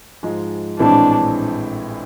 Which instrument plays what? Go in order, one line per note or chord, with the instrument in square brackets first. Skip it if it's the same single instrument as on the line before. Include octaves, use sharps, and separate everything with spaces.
[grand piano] G#2 F3 G#3
[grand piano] A#1 A2 E3 G#3 C4 [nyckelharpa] D4